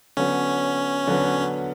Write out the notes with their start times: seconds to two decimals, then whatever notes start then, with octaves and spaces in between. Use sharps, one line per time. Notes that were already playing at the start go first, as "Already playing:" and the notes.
0.17 D3 F#3 B3 C#4
1.07 D3 F#3 B3